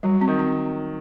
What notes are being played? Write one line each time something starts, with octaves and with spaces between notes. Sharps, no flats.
F#3 G3
C4
D#3
C4